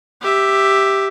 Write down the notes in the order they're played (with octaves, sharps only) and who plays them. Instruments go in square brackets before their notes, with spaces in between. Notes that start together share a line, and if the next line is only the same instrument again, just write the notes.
[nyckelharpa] G4 E5